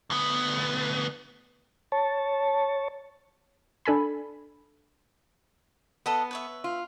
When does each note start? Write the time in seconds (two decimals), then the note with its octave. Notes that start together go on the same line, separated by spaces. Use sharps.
0.10 D2 B3
1.92 C#5 A5
3.85 D4 A4 G#5 B5
6.06 B3 A4 D#5 F#5
6.31 B4 C#5 E5
6.64 F4